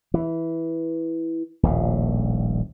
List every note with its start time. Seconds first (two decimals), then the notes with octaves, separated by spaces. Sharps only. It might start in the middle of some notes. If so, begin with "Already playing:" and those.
0.14 E3
1.63 D#1 A#1 A2